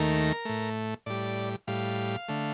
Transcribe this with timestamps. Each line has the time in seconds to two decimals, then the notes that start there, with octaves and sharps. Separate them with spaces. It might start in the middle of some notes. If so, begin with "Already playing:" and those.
Already playing: D#2 D#3 A3 A#4
0.45 A2 A3
1.06 A2 G3 D5
1.67 A2 G3 F5
2.29 D3 A3